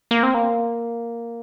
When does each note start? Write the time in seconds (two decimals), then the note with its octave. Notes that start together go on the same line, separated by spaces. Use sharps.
0.11 A#3
0.23 C4
0.34 A#3